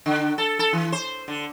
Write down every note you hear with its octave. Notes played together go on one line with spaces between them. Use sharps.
D3
A4
A4
E3
C5
D3